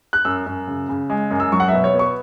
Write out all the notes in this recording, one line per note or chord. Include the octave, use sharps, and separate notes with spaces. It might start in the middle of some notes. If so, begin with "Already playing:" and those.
F#6
F#2 E6
F#2
C#3
C#3
G#3
F#2
E6
F#3 C#6
F#5
B2 E5
C#5
B3
C#6